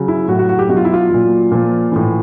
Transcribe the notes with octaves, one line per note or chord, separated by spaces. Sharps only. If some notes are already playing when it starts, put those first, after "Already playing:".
Already playing: C#3 F#3
E4
A2 F#3 F#4
F#4
F#4
G4
B2 F#4
F#3 F4
E4
F4
A#2 F#3
A#2 F3
A2 E3